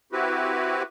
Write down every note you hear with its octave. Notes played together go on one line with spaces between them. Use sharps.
C4 E4 F#4 G4 B4